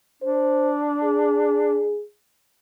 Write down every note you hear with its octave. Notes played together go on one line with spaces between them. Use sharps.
D4 C5
G#4